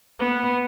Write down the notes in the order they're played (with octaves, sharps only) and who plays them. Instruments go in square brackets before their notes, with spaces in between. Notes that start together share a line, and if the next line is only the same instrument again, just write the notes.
[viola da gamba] B3